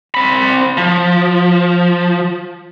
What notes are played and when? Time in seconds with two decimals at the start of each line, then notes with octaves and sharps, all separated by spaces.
0.14 C4 B5
0.77 F3